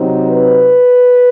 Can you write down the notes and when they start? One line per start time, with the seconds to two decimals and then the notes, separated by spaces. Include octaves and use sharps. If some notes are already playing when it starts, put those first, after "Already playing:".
Already playing: C3 F#3 C4 D#4
0.27 B4